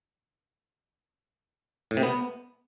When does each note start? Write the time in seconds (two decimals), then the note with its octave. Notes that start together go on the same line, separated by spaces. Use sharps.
1.91 A2
1.97 C3
2.03 B3